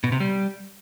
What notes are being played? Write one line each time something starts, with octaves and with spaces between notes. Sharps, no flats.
B2
C3
G3